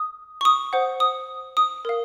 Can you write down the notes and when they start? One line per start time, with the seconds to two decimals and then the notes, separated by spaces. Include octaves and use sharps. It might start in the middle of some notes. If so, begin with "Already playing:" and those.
Already playing: D#6
0.41 C#6
0.45 D#6
0.73 C5 F#5
1.00 D#6
1.57 D#6
1.85 A#4 F5